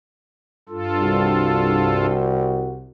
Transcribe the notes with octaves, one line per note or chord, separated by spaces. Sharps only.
G2 F4 A4
C2 F#4